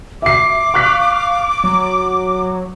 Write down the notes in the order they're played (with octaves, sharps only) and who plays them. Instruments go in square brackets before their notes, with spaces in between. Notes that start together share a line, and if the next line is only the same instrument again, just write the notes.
[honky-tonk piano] E5 C7 [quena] D6
[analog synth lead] F5 [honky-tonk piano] C#6 F#6 B6
[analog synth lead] F#3